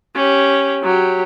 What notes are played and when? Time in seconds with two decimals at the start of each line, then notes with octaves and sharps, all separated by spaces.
0.15 C#4 G4
0.83 F#3 G4